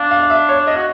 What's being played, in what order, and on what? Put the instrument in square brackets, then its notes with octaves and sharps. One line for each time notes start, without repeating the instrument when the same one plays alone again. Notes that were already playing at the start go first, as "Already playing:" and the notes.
Already playing: [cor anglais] D4 [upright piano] F5
[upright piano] F5
F5
E5
C#5
D#5
[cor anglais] F#4